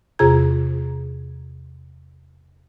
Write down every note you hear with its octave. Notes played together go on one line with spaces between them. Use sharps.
E2 C3 F4 G#4 A#5 G#6